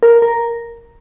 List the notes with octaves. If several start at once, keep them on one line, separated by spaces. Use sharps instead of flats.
A#4
A#4